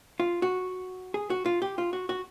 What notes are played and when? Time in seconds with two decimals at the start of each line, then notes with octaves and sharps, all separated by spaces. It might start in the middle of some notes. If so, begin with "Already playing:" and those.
0.20 F4
0.42 F#4
1.14 G#4
1.30 F#4
1.46 F4
1.62 G4
1.78 F4
1.93 F#4
2.09 F#4